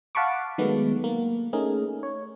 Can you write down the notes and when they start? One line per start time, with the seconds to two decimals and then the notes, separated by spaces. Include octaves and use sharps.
0.15 F5 F#5 A5 B5 C#6 D6
0.58 D#3 F#3 G#3 A3 B3
1.04 A#3
1.53 A3 C#4 D#4 G#4 A#4
2.03 C#5